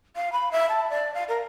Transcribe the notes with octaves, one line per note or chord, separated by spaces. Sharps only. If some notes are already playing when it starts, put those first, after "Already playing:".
F5
B5
E5
A5
D5
F5
A#4